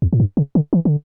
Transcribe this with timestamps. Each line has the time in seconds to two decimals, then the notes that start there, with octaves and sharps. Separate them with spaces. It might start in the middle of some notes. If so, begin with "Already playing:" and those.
0.02 E2
0.13 A2
0.20 G2
0.37 C#3
0.55 D3
0.73 E3
0.85 D3